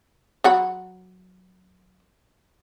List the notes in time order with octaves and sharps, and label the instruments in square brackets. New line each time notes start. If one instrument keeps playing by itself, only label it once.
[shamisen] F#3 F#5 B5